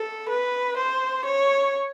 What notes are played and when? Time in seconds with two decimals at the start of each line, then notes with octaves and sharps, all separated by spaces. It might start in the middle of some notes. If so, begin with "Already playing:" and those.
Already playing: A4
0.29 B4
0.77 C5
1.25 C#5